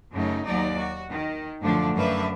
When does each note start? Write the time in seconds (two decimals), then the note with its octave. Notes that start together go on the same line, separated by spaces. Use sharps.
0.12 F#2 C#3 A3 D#4
0.44 D#2 F#3 D#4 D5
0.78 F#4
1.10 D#3
1.61 F#2 A2 D3 F3 A3 D4
1.97 F#2 D4 B4 E5 F5